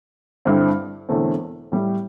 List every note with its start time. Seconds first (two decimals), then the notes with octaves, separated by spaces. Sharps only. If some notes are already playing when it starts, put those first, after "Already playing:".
0.45 G2 D3 C4 E4
1.09 E1 E2 D3 A3 C4
1.72 A2 G3 E4 G4